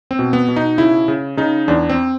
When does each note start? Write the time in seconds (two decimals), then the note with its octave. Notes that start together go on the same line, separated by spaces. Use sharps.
0.11 C4
0.19 B2
0.33 B3
0.48 B2
0.56 D#4
0.78 C#3 E4
1.08 C#3
1.37 C#3 D#4
1.68 E2 D4
1.89 C4